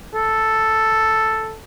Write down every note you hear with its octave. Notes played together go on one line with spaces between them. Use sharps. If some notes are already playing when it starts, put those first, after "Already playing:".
A4